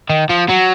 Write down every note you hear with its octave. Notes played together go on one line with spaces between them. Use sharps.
D#3
F3
F#3